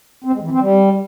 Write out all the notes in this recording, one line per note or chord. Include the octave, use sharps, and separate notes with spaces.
C4
G#3
E3
C4
G3